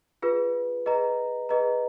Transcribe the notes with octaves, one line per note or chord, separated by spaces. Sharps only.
F4 G#4 B4
G#4 B4 D#5 A#5
G#4 B4 D#5 A#5